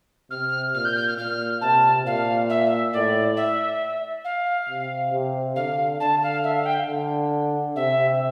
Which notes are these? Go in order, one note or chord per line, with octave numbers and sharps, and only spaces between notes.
C3 F6
A#2 F6
G6
G6
F6
A#2 F6
C3 A5
A#2 F5
E5
A2 D5
E5
F5
C3
C3
D3 F5
D3 A5
F5
E5
F5
G5
D3
C3 E5